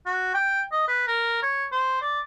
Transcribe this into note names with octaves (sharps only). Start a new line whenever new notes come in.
F#4
G5
D#5
B4
A#4
C#5
C5
D5